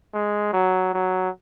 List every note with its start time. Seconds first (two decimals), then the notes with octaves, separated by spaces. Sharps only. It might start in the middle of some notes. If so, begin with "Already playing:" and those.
0.14 G#3
0.53 F#3
0.94 F#3